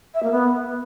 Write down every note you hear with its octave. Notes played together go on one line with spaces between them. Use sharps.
E5
A#3
B3